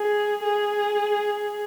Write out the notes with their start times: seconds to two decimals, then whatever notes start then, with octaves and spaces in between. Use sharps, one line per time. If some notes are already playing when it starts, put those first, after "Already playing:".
Already playing: G#4
0.43 G#4